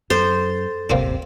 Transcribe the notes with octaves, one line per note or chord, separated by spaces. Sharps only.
F#2 A4 C5 A6
D1 G1 C3 A#3 C4 D4